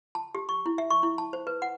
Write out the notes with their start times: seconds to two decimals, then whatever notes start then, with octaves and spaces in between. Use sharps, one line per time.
0.15 A5
0.35 G4
0.49 C#6
0.66 E4
0.78 E5
0.90 C#6
1.03 E4
1.18 A5
1.33 C5
1.47 B4
1.62 F#5